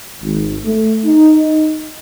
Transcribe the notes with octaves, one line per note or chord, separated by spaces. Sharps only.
G#1
A3
D#4